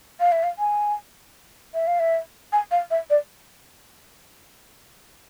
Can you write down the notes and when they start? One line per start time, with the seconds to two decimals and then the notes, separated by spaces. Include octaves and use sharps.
0.20 F5
0.32 E5
0.44 F5
0.59 G#5
1.74 E5
1.87 F5
2.00 E5
2.53 G#5
2.71 F5
2.91 E5
3.10 D5